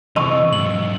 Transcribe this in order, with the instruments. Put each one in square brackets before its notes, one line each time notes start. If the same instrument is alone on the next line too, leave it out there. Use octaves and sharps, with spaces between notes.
[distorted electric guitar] C3 E3 [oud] D#5 [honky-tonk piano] C#6 E6 F7
[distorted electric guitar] G#2 F#3 [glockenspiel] F#7